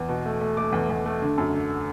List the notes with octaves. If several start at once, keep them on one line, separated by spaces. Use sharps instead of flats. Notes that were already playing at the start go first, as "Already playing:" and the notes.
Already playing: E2
B2
A3
A3
A3 D6
E2
E2
A3
D3
F#2
D3